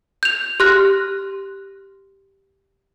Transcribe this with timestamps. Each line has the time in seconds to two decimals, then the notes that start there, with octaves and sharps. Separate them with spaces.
0.23 G6 F7
0.60 G4 C6 F6 F#6 A#6